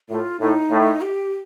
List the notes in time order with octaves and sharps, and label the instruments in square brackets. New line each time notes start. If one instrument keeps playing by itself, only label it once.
[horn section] A2 [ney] F4
[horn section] A2 [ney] D#4
[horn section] A2
[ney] G4